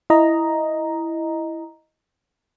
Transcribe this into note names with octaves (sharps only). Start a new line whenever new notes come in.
E4 D#5 A#5